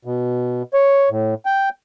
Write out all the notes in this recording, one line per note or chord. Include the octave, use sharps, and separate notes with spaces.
B2
C#5
A2
G5